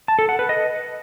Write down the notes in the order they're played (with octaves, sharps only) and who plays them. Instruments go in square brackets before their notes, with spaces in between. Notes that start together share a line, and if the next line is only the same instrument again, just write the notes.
[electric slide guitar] A5
A4
F#5
B4
D#5